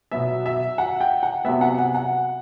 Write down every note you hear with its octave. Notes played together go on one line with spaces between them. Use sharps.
B2 F#3 B3 E5
E5
F#5
G5
F#5
C3 F#3 B3 E5
F#5
F#5
F#5